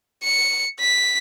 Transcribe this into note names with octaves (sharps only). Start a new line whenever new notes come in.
C#7
B6